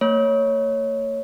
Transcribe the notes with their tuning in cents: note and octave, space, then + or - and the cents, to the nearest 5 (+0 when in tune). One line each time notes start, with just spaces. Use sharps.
A#3 -45 C#5 +0